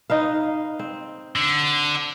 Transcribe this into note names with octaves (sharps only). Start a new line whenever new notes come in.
D#4 B4 F5
C4
D3